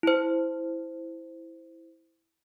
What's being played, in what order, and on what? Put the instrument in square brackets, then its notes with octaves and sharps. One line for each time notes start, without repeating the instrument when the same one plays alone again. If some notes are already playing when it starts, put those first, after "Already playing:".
[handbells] E4 C5